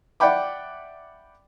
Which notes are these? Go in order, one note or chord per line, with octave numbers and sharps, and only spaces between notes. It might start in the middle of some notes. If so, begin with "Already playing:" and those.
D5 E5 F#5 G5 B5 D6